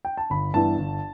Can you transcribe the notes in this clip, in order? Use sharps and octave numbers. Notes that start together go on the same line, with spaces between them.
G5
A5
G1 B5
G2 E3 B3 D4 A5
G1